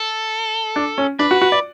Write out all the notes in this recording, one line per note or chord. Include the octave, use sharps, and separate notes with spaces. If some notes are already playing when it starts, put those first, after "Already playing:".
Already playing: A4
D4
C#4
D4 B4
F#4
F#4
D5